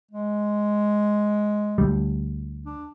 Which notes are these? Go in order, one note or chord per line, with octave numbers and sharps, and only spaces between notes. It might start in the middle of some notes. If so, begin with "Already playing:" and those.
G#3
D2 G3
D4